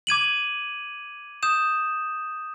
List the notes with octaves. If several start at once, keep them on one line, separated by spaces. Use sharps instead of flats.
D6 G#6 D#7 F#7
D#6 G6 E7